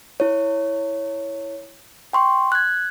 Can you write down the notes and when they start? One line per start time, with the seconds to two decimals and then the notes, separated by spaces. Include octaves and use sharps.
0.20 E4 C#5
2.13 G5 C6 C#6
2.52 F#6 G#6